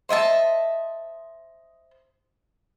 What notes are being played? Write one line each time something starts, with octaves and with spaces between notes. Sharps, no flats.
C5 D#5 E5 A5